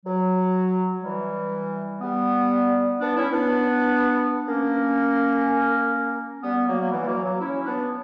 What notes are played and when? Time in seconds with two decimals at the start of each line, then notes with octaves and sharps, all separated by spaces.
0.06 F#3
1.03 E3 G3
2.01 G3 B3
3.00 B3 D4
3.16 C#4 E4
3.32 B3 D4
4.47 A#3 C#4
6.42 G3 B3
6.67 F#3 A#3
6.81 A#3
6.91 E3 G3
7.01 G3
7.07 F#3 A#3
7.24 F#3
7.40 C#4 E4
7.65 B3 D4